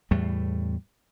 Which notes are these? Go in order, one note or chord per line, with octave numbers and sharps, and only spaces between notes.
E2 A2 G3 A3